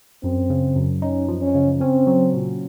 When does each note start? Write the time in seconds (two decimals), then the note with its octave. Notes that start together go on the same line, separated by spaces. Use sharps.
0.23 F#2 C4
0.50 C#3
0.76 F#2
1.02 C#4 D#4
1.28 F3
1.42 C#4
1.55 C#3
1.81 C4 C#4
2.07 F#3
2.34 A#2